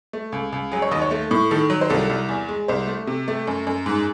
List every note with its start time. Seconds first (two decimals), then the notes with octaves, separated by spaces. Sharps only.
0.13 A3
0.32 C#2
0.52 C#2
0.72 F#3 G#4
0.82 C#5
0.91 D#2 D#5
1.02 C#5
1.11 A3
1.31 A2
1.51 D#3 A4
1.70 F#3
1.81 C5
1.90 C2 A4
2.09 C2
2.29 E2
2.49 G#3
2.68 C2 C5
2.87 A3
3.07 C3
3.28 A3
3.47 F#2
3.67 F#2
3.86 G#2